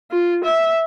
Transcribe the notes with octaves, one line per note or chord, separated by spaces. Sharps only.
F4
E5